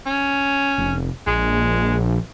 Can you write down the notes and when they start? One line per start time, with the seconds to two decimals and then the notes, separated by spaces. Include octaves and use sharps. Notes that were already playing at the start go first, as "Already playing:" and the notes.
0.06 C#4
0.78 F1
1.27 A#1 G#3